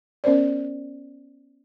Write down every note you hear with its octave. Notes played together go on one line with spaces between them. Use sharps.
B3 C#4 A#4 C5 D5